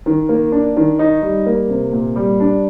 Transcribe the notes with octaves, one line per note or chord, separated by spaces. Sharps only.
D#3
A#3
D4
D#3
D#4
G3
A#3
C3
A#2
G3
D4